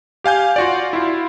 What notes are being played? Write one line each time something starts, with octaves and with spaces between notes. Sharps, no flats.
G4 F5 G#5 G6
F4 F#4 D5
E4 F4